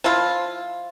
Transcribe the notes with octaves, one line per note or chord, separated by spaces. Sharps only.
F3 E4 F4